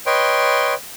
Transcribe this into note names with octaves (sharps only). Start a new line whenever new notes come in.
B4 C#5 D#5 G5 C6